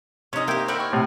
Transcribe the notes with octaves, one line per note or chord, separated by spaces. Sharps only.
C3 C#4 D#4 D#5
A#3 E4 G4 G5 D#6
C4 E4 A#4 F#5
C#5
A2 C3